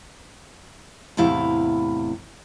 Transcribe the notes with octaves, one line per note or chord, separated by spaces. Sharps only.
E2 A2 C3 E4 F5